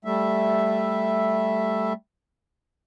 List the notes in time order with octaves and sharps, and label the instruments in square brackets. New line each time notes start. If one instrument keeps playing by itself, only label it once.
[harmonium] G3 A3 E5